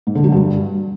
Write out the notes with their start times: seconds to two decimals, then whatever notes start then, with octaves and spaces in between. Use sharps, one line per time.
0.07 G#2
0.15 D3
0.24 F#3
0.32 G2